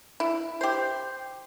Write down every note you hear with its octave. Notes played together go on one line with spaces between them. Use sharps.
E4
G4 C5